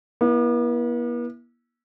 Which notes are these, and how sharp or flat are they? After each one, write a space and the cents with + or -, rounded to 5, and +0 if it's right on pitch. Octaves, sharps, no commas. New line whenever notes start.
B3 -45 E4 +0